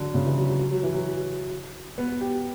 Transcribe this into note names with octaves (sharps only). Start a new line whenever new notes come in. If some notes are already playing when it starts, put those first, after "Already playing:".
Already playing: D3 F#3
C#3
E3
F#3
F#3
F#3
F#3
E3
F#3
B3
G4